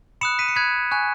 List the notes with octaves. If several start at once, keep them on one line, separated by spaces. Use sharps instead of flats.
B5 D#6 F#6 C#7 E7
B6 D#7
C#7
B5 D#6 F#6 G#6 B6
G#5 C#6 F#6